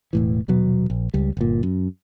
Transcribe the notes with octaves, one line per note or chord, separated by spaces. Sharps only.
E1 A2 E3
D#1 B2 F#3 B3
A#1
C#2 G3
G1 A#2
F#2